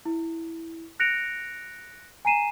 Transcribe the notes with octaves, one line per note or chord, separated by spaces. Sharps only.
E4
F#6 A#6 C#7 D7 F7
G#5 A#5 C7 D#7 E7